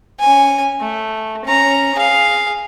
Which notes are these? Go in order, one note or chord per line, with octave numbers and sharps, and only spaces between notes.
C#4 G#5
A3
C#4 A#5
G#4 F5